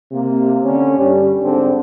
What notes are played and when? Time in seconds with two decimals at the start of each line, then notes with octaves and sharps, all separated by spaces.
0.12 C3 A#3
0.64 D3 C#4
0.98 G2 G3
1.43 G#2 D3 C4 D4